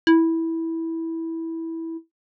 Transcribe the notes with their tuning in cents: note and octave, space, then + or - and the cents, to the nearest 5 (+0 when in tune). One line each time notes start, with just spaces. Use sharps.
E4 -10